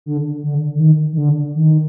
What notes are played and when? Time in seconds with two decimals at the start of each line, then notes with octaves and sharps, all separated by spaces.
0.06 D3
0.43 D3
0.75 D3
0.80 D#3
1.13 D#3
1.18 D3
1.55 D#3